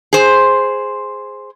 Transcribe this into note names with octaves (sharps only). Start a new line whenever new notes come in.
G#4 C5